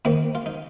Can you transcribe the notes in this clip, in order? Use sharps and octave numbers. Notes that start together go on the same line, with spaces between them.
F2 D#3 A#3 D#4
F4
D#4